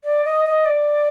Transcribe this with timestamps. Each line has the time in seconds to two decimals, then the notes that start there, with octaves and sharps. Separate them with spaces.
0.04 D5
0.25 D#5
0.45 D#5
0.65 D5